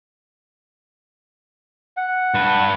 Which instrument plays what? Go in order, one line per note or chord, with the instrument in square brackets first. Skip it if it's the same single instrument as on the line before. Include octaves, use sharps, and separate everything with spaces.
[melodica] F#5
[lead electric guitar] G2 B4